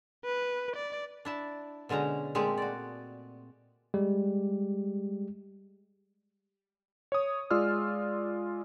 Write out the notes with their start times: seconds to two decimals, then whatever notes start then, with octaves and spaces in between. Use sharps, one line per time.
0.24 B4
0.76 D5
1.25 D4 E4 A5
1.89 B2 D3 G#3 C#4 A#5
2.35 A#2 G#3 A3 C4 G4 G#5
2.58 F#4 D5
3.94 G3 G#3 G4
7.12 C#5 D#6
7.51 G#3 F4 D5 E6 F6